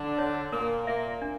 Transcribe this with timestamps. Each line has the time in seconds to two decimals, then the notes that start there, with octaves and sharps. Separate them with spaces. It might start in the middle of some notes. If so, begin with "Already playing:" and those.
Already playing: D3 D4
0.19 C#5
0.52 A#2 A#3 A#4
0.87 A#2 A#3 E5
1.22 D4